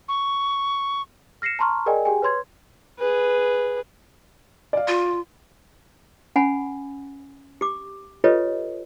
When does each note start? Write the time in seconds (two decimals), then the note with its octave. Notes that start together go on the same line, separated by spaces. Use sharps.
0.08 C#6
1.42 F6 A#6 C7 C#7 E7
1.59 A5 A#5 C6 C#6 F6
1.86 G#4 A#4 D5 D#5 G5 G#5
2.05 G4 G#4 G5 G#5
2.22 B4 C#5 C6 G#6
2.99 G#4 B4
4.73 D5 F5
4.88 F4
6.36 C#4 F#5 G#5 B5
7.61 G4 D6
8.24 F4 G4 A4 B4 C#5 D#5